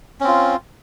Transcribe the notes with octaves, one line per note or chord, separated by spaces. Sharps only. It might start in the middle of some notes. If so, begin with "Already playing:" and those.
C4 C#4 F4